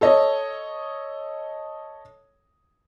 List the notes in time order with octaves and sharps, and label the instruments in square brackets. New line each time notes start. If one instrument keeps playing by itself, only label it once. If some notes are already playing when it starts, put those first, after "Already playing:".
[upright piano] A4 C#5 D#5